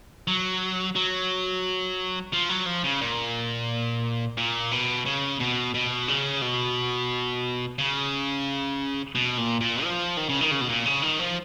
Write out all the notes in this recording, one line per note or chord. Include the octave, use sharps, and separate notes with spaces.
F#3
F#3
F3
F#3
F3
C#3
A#2
A#2
B2
C#3
B2
B2
C#3
B2
C#3
B2
A#2
A#2
F3
D#3
C#3
D#3
C#3
B2
A#2
C#3
D#3
F3